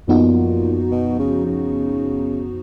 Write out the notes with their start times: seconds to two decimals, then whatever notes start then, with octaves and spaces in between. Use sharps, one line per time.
0.08 F#2 A#2 F3 B3 D#4 F#4
0.91 B2
1.19 C#3
1.46 C#3